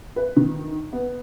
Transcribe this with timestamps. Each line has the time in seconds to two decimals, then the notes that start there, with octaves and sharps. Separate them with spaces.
0.16 B4
0.36 D#3
0.93 B3